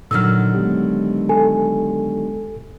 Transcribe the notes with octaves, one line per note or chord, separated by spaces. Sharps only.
A#2 D3 D#3 F#3 E6 F6
G#3 B3 G4
A4 G#5